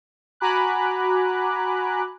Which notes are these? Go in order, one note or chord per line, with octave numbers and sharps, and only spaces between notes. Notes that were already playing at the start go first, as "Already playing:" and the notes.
F#4 G#5 A#5 B5 D6 F#6